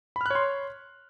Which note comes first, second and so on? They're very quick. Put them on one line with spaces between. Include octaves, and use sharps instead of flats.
B5 F6 F#6 C#5 C6